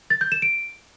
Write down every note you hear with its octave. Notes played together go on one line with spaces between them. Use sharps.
A6
G6
E7
D7